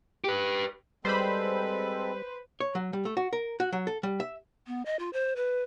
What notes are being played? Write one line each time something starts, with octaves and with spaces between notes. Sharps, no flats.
G4 B4
G3 G#3 C4 A4 B4 C5 B5
C#5
F#3
G3
A3
F#4
A#4
F#4
F#3
A4
G3
E5
B3
D#5
F4
C5
B4